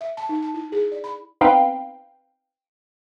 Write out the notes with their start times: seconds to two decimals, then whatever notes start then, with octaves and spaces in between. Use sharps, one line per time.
0.01 E5
0.17 A5
0.29 D#4
0.42 A5
0.54 E4
0.72 G#4
0.92 D5
1.04 B5
1.41 B3 C4 D#4 B4 F5 G5